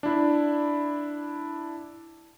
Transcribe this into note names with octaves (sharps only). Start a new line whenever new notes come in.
D4 E4